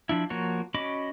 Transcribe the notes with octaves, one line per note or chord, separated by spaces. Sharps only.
F3 D4 E4
F3 A#3 F#4 C#5
C#4 F#4 D#5 B5 D6